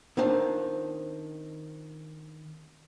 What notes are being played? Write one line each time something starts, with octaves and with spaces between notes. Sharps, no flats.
D#3 C4 D4 F4 C5 A5